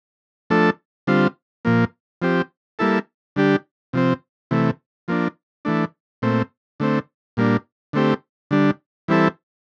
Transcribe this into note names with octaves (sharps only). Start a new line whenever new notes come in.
F3 A3 D4 A4
D3 G3 C4 F4
A#2 F3 A#3
F3 C4 G4
G3 A#3 E4 A4
D3 G3 D4 G4
C3 F3 C4
C3 E3 A3
F3 A#3 D4
E3 A3 D4
A#2 A3 C4
D3 A3 C4
A#2 G3 A#3 D4
D3 A3 C4 G4
D3 G3 D4
E3 G3 C4 E4 A4